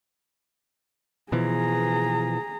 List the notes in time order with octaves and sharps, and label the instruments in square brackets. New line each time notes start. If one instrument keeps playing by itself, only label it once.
[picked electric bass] B2 E3 F3 [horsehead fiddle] G#4 A#5